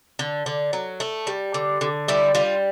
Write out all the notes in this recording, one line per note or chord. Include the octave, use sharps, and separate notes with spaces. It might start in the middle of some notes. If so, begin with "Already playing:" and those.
D3
D3
F#3
A3
G3
D3
D3
G3 E4
G3 F4